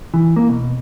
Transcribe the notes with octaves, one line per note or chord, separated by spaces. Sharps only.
E3
A#3
B2